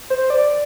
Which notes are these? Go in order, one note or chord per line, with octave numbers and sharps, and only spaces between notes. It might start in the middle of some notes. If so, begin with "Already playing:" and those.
C5
D5